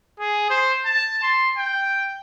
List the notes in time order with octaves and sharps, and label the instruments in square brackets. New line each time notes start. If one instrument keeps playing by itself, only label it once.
[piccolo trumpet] G#4
C5
A5
C6
G5